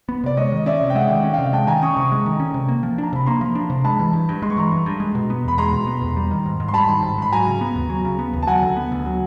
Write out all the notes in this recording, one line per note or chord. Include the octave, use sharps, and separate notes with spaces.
B3
C3 D5
G#3 C#5 D#5
D#3
C#4 D5 E5
C3
G5
G#3 E5 F#5
D#3
C#4
C3 F5 G5
G#3 G5 A5
D#3 G#5 A#5
C#4 C#6 D#6
C3 C#6 D#6
G#3
D#3
C#4
C3
A#3
F3
D4
A#5
C3 B5
A#3 A#5 C6
F3
D4
C3
G#3 A5 B5
E3
G2
G2
G#3 C6
C#6
E3 A#5 C6
G2
G2
G#3
B2
B3
E2 B5
G#3 A#5 C6
B2
B3
E2
G3
D#3
G#2
G#2
C6
G3 A5 B5
D#3
G#2
G#2 B5
F#3 G#5 A#5
C#3
B3
D#2
F#3
C#3
B3
D#2
A5
F#3 F#5 G#5
D3
B3
D2
F#3